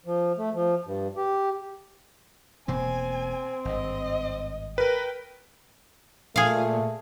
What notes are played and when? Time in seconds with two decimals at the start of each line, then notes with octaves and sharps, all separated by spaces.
0.06 F3
0.38 A3
0.54 F3
0.86 G2
1.16 G4
2.68 E1 B2 A#3 C4 G#5
3.65 G#1 G2 D#5
4.78 A#4 B4 G5
6.36 A#2 A3 G#4 F5